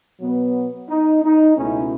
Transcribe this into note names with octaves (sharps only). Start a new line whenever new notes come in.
B2 F#3 B3
D#4
D#4
C#2 B2 A3 C#4 E4